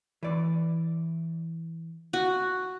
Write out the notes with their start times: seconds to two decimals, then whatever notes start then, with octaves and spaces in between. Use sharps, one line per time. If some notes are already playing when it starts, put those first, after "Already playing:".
0.23 E3 D5
2.13 F#4